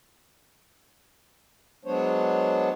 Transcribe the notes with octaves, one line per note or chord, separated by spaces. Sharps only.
F#3 G#3 B3 D4 C5 C#5